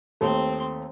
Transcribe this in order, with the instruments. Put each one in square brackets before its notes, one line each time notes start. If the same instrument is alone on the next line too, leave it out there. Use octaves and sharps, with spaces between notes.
[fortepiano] D#2 A3 [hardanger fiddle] C4 C6